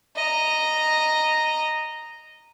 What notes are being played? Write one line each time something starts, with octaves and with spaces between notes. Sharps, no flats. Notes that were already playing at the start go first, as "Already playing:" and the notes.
D#5 A#5